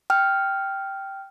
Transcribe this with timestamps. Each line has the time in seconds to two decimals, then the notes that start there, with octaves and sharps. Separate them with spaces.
0.10 G5 F6